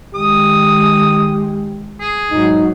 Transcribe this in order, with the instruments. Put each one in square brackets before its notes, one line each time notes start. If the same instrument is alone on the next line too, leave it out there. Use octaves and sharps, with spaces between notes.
[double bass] D#3 G#3 [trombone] G4 [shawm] D#6
[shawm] G#4
[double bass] G#2 F#3 [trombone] D#4